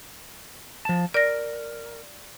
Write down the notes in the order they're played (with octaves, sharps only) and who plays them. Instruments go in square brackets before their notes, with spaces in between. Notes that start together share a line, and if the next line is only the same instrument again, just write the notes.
[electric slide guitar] F3 A5
[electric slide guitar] A#4 [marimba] D5 A#6